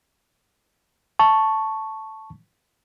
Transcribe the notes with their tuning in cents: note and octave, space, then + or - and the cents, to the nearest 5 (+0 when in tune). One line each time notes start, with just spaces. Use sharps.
A5 +0 C#6 +0